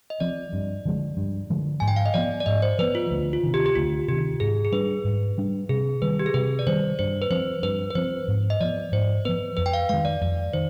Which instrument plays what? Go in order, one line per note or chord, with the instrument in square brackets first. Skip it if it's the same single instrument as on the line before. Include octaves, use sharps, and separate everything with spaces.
[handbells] D#5
[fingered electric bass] F3 C4 [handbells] D5
[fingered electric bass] G2
D3 F3 G#3
G2
D3 F3 G#3
[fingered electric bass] G#2 [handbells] G#5
[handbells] G5
F5
D#5
[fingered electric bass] F3 B3 [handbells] D5
[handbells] D5
[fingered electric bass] G#2 [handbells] D#5
[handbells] C5
[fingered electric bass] F3 B3 [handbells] B4
[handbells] F4
[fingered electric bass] D2
[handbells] F4
[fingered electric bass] C3 D#3
[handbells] G4
G4
[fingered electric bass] D2 [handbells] F4
[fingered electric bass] C3 D#3 [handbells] G4
[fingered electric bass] G#2 [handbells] G#4
[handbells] G#4
[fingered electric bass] G3 D4 [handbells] B4
[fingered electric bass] G#2
G3 D4
[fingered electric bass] C3 [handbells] G#4
[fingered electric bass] D#3 G3 [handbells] B4
[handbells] G4
G#4
[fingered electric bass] C3 [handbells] B4
[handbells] D5
[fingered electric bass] D#3 G3 [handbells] C5
[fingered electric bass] G2 [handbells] C5
[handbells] B4
[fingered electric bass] F3 C4 [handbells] C5
[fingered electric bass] G2 [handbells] B4
[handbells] B4
[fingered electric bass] F3 C4 [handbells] C5
[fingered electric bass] G#2
[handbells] D#5
[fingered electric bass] F3 B3 [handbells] D5
[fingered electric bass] G#2 [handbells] C5
[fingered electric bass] F3 B3 [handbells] B4
[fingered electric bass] F2 [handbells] B4
[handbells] G5
F5
[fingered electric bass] D#3 G#3 [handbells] F5
[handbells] D5
[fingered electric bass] F2 [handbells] D5
[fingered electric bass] D#3 [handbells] C5